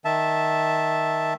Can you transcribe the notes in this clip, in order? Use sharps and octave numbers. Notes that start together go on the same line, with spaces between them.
D#3 E5 A5